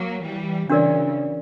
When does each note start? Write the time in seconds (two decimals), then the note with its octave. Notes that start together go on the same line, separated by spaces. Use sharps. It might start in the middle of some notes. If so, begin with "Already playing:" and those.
Already playing: F#3 A#3
0.22 E3 G3
0.69 C#3 E3 D4 F#4 A#4 D5